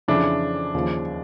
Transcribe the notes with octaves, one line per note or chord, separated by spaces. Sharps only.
F2 C#3 E3 D4 E4
D#2 C#3 F3